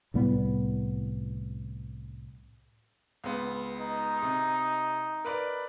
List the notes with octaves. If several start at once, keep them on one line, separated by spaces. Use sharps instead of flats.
C2 A2 G3 B3
C#2 B3
D#4
C3
A#4 B4 D5